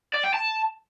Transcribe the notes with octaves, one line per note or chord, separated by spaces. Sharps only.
D5
G5
A5